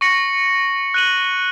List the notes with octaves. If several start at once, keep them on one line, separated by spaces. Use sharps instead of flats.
C#6 A#6 C#7 F#7
F#6 D#7 F#7